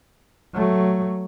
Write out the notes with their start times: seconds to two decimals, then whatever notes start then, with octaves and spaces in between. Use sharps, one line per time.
0.54 F#3 A3